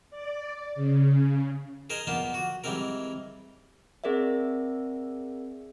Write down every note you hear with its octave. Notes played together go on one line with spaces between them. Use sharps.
D5
C#3
G#4 A#4 C5 D#5 G#5 A#5
A#2 A#3 B3 F4 C5
F#4
E3 G3 G#3 C4 A#4
C4 G#4 A#4 D5 E5